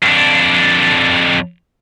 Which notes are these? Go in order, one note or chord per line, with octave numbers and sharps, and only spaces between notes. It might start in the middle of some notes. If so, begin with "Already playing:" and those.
F2 D4